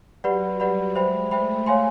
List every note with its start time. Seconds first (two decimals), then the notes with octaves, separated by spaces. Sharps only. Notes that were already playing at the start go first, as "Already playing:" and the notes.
0.24 F#3 G4 B4 D5 F#5 B5
0.60 G3 G4 B4 D5 F#5 B5
0.95 G#3 C5 E5 G5 B5
1.31 A3 C5 E5 G5 B5
1.66 C#5 F5 G#5 C6